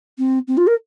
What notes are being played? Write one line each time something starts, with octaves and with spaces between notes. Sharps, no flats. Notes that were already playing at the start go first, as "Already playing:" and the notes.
C4
C4
F4
A#4